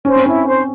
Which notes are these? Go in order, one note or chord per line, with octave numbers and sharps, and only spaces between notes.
C#4 C5
C4
C#4 E4
C5